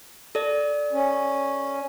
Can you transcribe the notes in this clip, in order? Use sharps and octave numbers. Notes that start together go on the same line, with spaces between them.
A4 D5
C#4